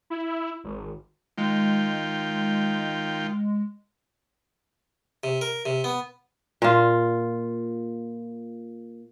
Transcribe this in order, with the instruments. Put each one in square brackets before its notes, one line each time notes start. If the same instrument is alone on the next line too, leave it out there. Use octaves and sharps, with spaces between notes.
[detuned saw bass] E4
G#1
[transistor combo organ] D#3 F4 G5 [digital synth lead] G#3
[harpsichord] C3
A#4
C3
B3
[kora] A#2 F4